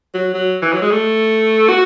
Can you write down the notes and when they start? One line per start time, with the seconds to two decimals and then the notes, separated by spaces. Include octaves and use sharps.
0.14 F#3
0.34 F#3
0.62 E3
0.73 F#3
0.82 G#3
0.91 A3
1.69 F#4